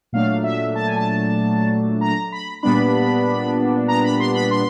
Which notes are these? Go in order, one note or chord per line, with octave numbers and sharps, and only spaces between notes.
A#2 F#3 A3 D4 F5
E5
A5
G#5
A5
A#5
B5
A#2 G3 B3 D4 B5
A#5
B5
C6
B5
C6